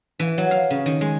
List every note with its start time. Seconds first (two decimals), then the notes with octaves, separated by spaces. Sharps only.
0.19 E3
0.38 F#3
0.51 F5
0.70 C#3
0.86 D#3
1.01 G#3